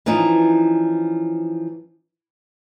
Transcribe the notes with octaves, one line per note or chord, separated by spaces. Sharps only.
E3 F3 C#4 D#4